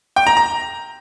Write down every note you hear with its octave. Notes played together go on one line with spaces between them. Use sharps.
G5
A#5
A#5